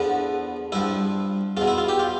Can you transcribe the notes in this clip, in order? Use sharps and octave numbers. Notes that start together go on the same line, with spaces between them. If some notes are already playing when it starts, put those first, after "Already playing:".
Already playing: E2 D3 F3 B3
G2 F3 E4
E2 B2 F4
E4
F4
G4
F4